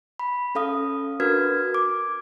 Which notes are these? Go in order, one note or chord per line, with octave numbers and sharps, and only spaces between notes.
B5
C#4 A4 F5 D#6
D4 F#4 A#4 B4 F6 G#6
D6